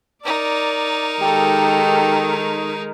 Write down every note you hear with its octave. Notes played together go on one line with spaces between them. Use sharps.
D#4 A#4 D5
D#3 G#3 G4 A4